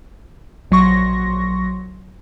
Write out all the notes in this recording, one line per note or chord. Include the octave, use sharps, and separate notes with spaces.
A#1 F#3 C6 C#6 A#6